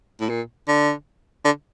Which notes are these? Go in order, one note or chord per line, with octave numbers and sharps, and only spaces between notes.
A2
A#2
D3
D3